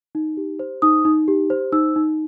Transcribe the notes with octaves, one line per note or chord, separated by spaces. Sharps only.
D#4
G4
C5
D#4 D#6
D#4
G4
C5
D#4 E6
D#4